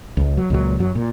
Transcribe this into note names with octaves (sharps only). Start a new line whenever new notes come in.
C#2
F#3
C#2 A#2 F#3
F#2 F#3
A#2